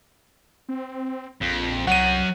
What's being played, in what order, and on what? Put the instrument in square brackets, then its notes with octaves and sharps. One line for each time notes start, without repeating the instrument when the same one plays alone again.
[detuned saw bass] C4
[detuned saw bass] A#1 [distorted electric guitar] F2
[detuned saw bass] C2 [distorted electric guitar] F#2 F#3 [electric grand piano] F#5 D#7